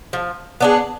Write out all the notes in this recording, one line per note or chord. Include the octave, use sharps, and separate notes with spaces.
F3
B3 D4 G#4